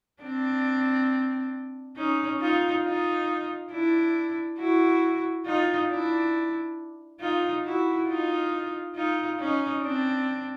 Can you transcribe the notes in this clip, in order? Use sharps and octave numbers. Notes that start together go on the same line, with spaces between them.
C4 D4
C#4 D#4
D#4 F4
D#4 F4
D4 E4
E4 F#4
D#4 F4
D4 E4
D#4 F4
E4 F#4
D#4 F4
D#4 F4
C#4 D#4
C4 D4